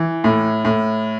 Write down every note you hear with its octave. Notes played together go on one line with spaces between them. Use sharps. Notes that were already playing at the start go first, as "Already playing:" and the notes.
Already playing: E3
A2
A2